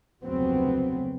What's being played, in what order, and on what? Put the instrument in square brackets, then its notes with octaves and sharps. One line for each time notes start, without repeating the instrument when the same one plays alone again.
[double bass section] F1 D2 C#3 F#3 B3 C4